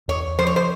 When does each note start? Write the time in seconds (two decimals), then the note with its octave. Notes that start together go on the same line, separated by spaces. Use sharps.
0.08 E2 C#5
0.38 F3 C5
0.47 C#5
0.56 C5